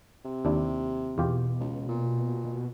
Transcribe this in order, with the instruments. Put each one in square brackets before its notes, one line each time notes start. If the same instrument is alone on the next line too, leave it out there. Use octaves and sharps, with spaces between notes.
[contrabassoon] C3
[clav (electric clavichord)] D#2 D4 E4
[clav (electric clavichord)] E2 F4 G4 [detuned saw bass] B2
[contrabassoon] C#2
A#2